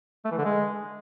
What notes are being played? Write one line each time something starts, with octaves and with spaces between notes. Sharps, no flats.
A3
E3
D3
G#3